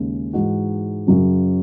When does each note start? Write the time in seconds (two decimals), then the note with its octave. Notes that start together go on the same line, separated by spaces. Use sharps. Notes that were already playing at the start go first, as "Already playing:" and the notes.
Already playing: D#2 C#3 G#3
0.33 G#2 E3 G#3 D#4 F#4
1.07 F#2 C#3 F#3 C#4